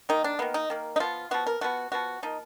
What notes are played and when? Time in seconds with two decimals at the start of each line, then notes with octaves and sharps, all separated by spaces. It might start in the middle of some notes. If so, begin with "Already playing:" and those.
0.09 D#3 A#3 D#4
0.24 D4
0.39 D#3 A#3 B3
0.54 D#4
0.70 D#3 A#3
0.96 D#4
1.00 F3 B3 F4
1.31 F3 B3 F#4
1.47 A#4
1.61 F3 B3 F#4
1.92 F3 B3 F#4
2.23 F3 A#3 D#4